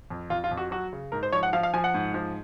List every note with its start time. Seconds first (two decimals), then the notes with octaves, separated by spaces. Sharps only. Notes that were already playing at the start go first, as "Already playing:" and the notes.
0.10 F2
0.30 F2 F4
0.44 F4
0.51 F2
0.57 F#4
0.71 F#3 F#4
0.93 C#3
1.12 G#2 A#4
1.23 C5
1.33 F3 C#5
1.43 F#5
1.53 F3 F5
1.63 F5
1.74 F3 G#5
1.84 F#5
1.94 G#2
2.14 F3